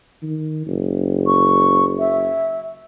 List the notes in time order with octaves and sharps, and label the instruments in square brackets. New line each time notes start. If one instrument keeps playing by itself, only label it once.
[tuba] D#3
F#1
[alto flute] C#6
E5